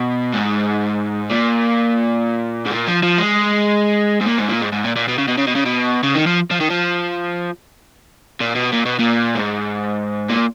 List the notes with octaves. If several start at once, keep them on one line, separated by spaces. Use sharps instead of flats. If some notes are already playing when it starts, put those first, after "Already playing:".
Already playing: B2
G#2
A#2
G#2
A#2
F3
F3
G#3
G#2
A#2
G#2
A#2
G#2
G#2
A#2
A#2
B2
C#3
B2
C#3
B2
C#3
B2
C#3
D#3
F3
F3
D#3
F3
A#2
B2
A#2
B2
A#2
G#2
A#2